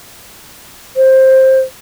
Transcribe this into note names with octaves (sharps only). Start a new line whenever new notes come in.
C5